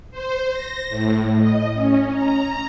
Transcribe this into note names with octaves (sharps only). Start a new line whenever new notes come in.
C5
A#6
A2
D#5
C#4
A#5